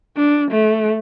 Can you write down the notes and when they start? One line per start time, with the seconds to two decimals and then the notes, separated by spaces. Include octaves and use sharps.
0.17 D4
0.51 A3